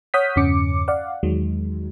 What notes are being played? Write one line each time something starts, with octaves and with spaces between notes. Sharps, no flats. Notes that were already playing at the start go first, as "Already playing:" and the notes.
C#5 F#5 D#6 F6 G6 B6
E2 G2 C#3 C#4 D6 C#7
D5 F5 F#5
E2 D#3 F#3 G#3